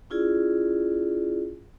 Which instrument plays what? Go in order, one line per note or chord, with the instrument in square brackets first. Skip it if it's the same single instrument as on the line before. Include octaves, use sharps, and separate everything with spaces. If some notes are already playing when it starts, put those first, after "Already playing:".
[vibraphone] C#4 E4 F4 G#4 D5